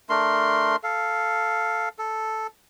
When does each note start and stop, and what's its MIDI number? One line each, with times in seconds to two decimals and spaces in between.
0.09 0.76 57
0.09 0.76 62
0.09 0.76 70
0.09 0.76 84
0.83 1.89 69
0.83 1.89 77
1.99 2.47 69